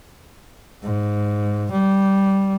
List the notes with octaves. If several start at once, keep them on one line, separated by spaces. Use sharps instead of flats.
G#2
G3